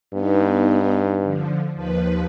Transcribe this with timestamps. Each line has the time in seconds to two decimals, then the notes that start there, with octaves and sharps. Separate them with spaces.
0.13 G2 B3 D#4
1.22 D3 F3
1.75 D#2 F3 B4